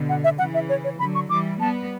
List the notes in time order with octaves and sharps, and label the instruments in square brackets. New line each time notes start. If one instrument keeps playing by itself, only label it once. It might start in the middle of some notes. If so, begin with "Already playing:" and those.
Already playing: [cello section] B2 D3
[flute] F#5
E5
[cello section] C#3 E3 [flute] F#5
[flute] E5
C#5
C#5
[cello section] D3 F#3 [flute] B5
[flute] C#6
[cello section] E3 G3 [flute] D6
[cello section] G3 B3 [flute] A5